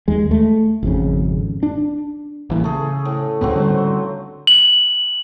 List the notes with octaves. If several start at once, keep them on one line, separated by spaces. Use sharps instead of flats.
D#2 G#3
A3
G#1 F2 C#3
D4
A1 E3 A#3
C#3 A3 G#4
A2
C#2 G#2 C#3 F#3 B3 C4
D3 G3
F#7